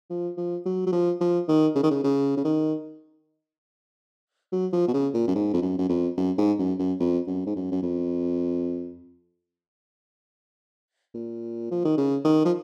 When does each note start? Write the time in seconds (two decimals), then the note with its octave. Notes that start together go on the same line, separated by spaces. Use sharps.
0.10 F3
0.38 F3
0.66 F#3
0.87 F#3
0.92 F3
1.21 F3
1.48 D#3
1.76 C#3
1.83 D#3
1.91 C#3
2.04 C#3
2.37 C#3
2.45 D#3
4.52 F#3
4.73 F3
4.88 B2
4.94 C#3
5.14 A#2
5.28 F#2
5.35 G#2
5.54 F2
5.62 F#2
5.78 F#2
5.89 F2
6.17 F#2
6.38 G#2
6.59 F#2
6.79 F#2
7.00 F2
7.27 F#2
7.46 G#2
7.56 F#2
7.72 F#2
7.83 F2
11.14 A#2
11.71 F3
11.85 D#3
11.98 C#3
12.24 D#3
12.45 F3